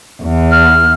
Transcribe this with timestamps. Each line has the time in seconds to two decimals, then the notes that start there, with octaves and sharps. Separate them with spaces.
0.23 E2
0.51 F6